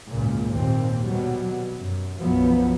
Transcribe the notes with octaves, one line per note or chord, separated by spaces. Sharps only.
G#1 C#2 F#2 A#2
D#2 A#2 C4
B2 F#3 G3
F#2
B1 F#2 F3 F#3 B3